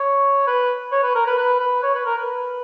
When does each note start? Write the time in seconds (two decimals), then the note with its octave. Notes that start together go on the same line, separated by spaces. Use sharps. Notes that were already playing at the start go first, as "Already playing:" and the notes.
Already playing: C#5
0.47 B4
0.92 C#5
1.03 B4
1.15 A#4
1.27 B4
1.38 B4
1.60 B4
1.83 C#5
1.95 B4
2.06 A#4
2.18 B4